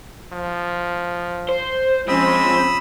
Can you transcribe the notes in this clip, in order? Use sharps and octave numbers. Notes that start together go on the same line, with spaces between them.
F3
C5
F3 G#3 C4 C#4 B5 D#6 E6